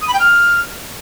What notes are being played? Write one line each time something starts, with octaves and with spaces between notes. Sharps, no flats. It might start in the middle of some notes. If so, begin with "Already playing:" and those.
D#6
B5
G5
F6